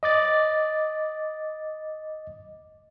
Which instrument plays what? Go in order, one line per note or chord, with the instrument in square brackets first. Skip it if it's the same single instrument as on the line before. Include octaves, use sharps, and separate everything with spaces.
[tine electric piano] D#5 D6 A6